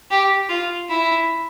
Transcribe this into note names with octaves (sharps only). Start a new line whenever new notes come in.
G4
F4
E4